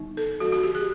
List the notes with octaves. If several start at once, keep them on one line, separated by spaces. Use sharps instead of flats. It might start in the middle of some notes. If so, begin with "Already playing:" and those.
Already playing: D3 G3 B3 D#4
A4
D3 F3 G#3 B3 F#4
F#4
G4
G#4